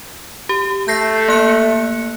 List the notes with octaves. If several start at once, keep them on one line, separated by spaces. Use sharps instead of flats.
G4
A3 G6 A#6 C7
A#3 F#6 C#7